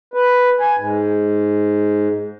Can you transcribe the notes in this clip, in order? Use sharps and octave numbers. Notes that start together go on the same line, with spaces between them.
B4
G#5
G#2